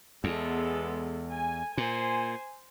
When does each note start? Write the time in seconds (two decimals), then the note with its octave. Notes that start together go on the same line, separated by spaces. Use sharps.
0.24 E2 G#3 B3 A4
1.33 G#5
1.78 A#2 C5 G#5